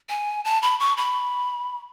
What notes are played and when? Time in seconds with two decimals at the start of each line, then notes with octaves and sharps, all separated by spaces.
0.09 G#5
0.45 A5
0.62 B5
0.80 C#6
0.97 B5